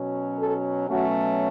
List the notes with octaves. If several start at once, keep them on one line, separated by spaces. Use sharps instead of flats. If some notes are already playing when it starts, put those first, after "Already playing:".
Already playing: B2 F#3 C#4
A4
B2 F#3 A3 C#4 F#4